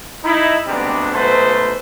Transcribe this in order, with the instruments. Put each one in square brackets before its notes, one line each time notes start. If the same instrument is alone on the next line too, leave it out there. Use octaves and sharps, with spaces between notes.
[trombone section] D#4 E4
D2 C3 G3 G#3 B3 D4
G#2 B2 F#3 A3 B4 C5